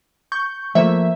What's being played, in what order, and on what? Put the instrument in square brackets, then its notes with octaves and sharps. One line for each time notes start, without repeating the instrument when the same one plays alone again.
[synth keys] C#6 G6
[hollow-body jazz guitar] F3 A3 A#3 [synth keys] E5